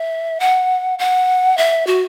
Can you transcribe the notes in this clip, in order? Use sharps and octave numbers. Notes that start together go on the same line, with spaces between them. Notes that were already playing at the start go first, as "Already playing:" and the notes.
Already playing: E5
F#5
F#5
E5
F#4